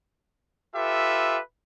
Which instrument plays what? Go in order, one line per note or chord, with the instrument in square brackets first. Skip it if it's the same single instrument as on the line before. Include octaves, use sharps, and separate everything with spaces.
[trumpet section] F4 G4 A4 B4 E5